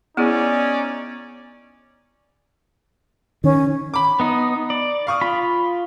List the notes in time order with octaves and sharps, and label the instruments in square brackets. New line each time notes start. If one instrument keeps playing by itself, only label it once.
[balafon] B3 E4 G#4 [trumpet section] C#4 D#4 D5
[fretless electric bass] D#3 [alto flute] C#4
[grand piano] B5 D6
[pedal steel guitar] B3 D#4
D5
[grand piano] F5 C#6 D#6
[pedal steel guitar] F4 B5